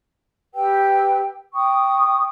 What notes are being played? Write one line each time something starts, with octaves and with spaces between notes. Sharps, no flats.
G4 B4 G5 E6
G5 C#6 D#6